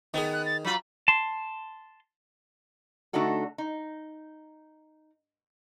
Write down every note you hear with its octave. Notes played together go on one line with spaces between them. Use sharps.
D#3 B3 G#4
F#6
A6
F#3 F4 B5
A5 C6
D3 A3 D4 D#4 F#4 A4
D#4